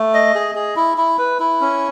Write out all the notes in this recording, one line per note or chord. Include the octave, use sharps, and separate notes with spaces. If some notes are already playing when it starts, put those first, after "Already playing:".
Already playing: A3
D#5
G#4
G#4
E4
E4
B4
E4
C#4